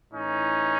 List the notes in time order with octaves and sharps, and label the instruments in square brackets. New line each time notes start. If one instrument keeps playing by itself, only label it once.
[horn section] A2 E3 C#4 D#4